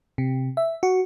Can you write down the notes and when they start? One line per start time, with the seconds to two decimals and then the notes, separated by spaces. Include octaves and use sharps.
0.18 C3
0.57 E5
0.83 F#4